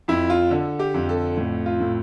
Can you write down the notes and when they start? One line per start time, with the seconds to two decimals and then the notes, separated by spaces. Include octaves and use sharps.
0.08 F2 E4
0.30 F4
0.51 D3 A4
0.79 G4
0.94 F2
1.09 A4
1.37 A2
1.66 F4
1.80 A2